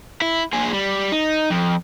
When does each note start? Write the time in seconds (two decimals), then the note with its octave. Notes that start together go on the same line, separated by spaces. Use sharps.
0.22 E4
0.53 A#2 G#4
0.73 G3
1.12 D#4
1.50 F2